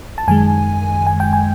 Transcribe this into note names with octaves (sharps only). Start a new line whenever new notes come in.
A5
F#2 D#3 G#3 G#5
G#5
G5
G#5